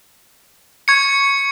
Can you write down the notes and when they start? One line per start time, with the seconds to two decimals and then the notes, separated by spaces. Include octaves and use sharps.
0.88 C#6 G#6 C#7